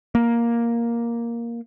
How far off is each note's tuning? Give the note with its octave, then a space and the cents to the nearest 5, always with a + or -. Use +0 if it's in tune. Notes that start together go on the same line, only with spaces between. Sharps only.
A#3 +5